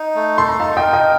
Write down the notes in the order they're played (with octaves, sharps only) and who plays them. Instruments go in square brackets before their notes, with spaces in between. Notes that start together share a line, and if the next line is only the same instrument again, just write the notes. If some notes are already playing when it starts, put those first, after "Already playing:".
Already playing: [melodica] D#4
A3
[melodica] A4 [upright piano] C6
[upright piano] A#5
[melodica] D#4 [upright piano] F5 A5
[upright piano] D#5 G5
[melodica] A#4
[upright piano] D#5 G5